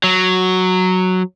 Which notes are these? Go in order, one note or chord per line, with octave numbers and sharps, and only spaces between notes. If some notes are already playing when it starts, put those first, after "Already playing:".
F#3